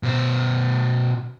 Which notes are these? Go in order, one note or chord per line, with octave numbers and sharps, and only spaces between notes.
B2 C5